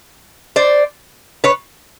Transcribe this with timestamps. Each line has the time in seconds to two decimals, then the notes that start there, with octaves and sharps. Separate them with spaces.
0.56 C5 D5
1.44 B4 C#5